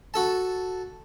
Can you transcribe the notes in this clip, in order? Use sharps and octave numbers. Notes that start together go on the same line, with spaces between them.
F#4 A4 A5